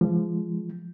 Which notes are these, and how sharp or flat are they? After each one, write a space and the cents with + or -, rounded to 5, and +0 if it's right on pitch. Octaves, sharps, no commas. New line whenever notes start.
F3 -25 G#3 +0